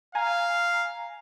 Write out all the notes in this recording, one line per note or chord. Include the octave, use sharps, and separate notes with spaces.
F5 G#5 A#5